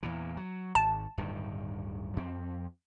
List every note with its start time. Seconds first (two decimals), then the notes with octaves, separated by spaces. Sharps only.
0.03 E2 A#2 E3
0.37 F#3
0.75 G#1 A5
1.18 D1 G2 D#3
2.16 F2 C4